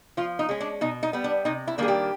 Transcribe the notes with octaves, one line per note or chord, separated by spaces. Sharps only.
F3 F4
D#4
G#3 C#4
D4
B2 D#4
D#4
G3 B3
D4
C3 D#4
E4
D#3 G3 A#3 D4 G#4
G4